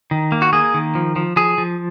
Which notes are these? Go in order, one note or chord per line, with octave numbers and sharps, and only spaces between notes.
D#3
A#3
F#4
A#3 G#4
D#3
F3
F3
F3 G#4
F3